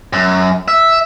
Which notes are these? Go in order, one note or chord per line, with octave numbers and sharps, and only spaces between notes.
F#2
E5